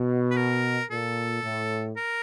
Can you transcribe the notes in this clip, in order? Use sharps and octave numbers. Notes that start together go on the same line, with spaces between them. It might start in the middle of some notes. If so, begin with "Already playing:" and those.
Already playing: B2
B4
A#4
A#2 A4
A2
A#4